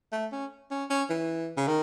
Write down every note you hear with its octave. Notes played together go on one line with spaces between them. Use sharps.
A3
C#4
C#4
C#4
E3
C#3
D#3